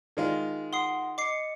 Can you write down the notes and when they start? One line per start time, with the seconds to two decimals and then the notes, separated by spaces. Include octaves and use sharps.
0.17 D#3 G#3 F4
0.73 F#5 C6 D#6 C7
1.18 D#5 D6 C7 C#7